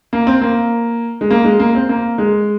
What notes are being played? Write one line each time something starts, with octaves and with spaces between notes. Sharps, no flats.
A#3
C4
A#3
G#3
A#3
G#3
A#3
C4
A#3
G#3